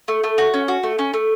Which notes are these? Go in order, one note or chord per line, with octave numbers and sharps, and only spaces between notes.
A3
A3
F#4
C#4
F#4
A3
C#4
A3